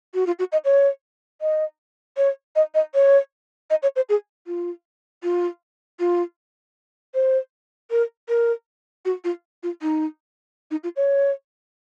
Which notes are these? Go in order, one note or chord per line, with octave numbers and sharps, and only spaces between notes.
F#4
F4
F#4
D#5
C#5
D#5
C#5
D#5
D#5
C#5
D#5
C#5
C5
G#4
F4
F4
F4
C5
A#4
A#4
F#4
F4
F4
D#4
D#4
F4
C#5